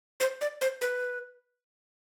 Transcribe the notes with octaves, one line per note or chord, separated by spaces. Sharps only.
C5
D5
C5
B4